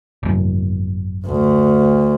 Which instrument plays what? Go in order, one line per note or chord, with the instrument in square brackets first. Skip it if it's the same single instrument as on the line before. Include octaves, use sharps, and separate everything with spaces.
[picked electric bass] G#1 F#2
[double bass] D2